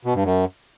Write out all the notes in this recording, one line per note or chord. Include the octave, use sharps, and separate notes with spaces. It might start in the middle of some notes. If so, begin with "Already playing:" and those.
B2
G2
F#2